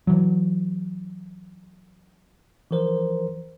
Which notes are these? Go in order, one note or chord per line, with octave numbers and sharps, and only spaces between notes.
E3 F#3
E3 F3 A#4 C5